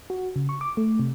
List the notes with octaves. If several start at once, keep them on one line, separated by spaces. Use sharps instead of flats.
F#4
C#3
C#6
D6
A3
C3